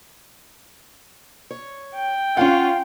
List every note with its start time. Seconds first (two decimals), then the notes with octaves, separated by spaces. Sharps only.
1.51 C#5
1.95 G5
2.37 C#4 F4 F5 F#5 G#5